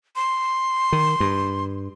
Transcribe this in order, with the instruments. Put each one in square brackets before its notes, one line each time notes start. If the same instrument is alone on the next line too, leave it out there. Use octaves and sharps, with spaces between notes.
[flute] C6
[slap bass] D#3
G2